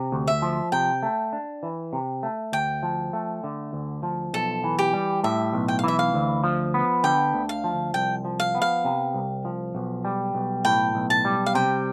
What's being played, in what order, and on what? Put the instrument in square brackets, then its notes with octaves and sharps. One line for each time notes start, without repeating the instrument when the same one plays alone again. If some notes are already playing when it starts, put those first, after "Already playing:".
Already playing: [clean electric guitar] C3
D2
[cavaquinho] E5
[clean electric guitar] F3
[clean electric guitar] C3 [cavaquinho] G5
[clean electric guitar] A3
D4
E3
C3
A3
[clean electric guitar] D2 [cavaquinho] G5
[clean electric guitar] F3
A3
D3
D2
F3
[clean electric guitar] B1 [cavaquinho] A4
[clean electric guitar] E3
[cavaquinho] G4
[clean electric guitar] G3
[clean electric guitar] A2 [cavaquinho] E5
[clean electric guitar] B1
[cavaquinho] G5
F5
[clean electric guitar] E3 [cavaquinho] E5
[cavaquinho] F5
[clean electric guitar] D2
F3
B3
[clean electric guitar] D3 [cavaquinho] G5
[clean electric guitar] D2
[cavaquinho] F5
[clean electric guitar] F3
[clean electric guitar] C2 [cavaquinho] G5
[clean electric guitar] F3
[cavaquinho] F5
[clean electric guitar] B3
[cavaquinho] F5
[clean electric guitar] C3
C2
F3
B1
G3
B1
[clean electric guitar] A2 [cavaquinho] G5
[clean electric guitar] B1
[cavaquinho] A5
[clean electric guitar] G3
[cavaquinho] F5
[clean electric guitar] C3 [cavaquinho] G5